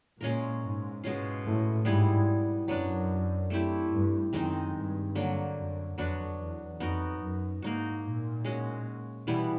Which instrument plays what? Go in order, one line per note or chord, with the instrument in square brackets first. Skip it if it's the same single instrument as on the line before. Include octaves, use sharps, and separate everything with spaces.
[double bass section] A#2 [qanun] G#3 C#4 F4 A#4
[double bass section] G#2
[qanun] B2 G#3 C#4 F4
[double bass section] A2
[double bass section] G#2 [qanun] G3 B3 E4 G#4
[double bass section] F#2 [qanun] F#3 B3 D4
[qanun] A3 C4 E4 G4
[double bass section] G2
[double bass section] F#2 [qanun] D#3 G#3 C4 D#4
[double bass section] G2
[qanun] D3 F#3 A#3
[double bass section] F#2
[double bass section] F2 [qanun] F#3 B3 D4 F#4
[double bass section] E2
[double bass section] F2 [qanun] B3 D#4 F#4 A#4
[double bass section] F#2
[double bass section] G#2 [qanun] A#3 D#4 F#4
[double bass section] A#2
[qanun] G#3 C#4 F#4
[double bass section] B2 [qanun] E3 G3 B3 E4